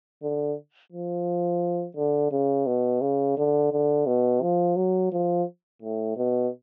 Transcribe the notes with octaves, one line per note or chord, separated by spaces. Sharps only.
D3
F3
D3
C#3
B2
C#3
D3
D3
B2
F3
F#3
F3
A2
B2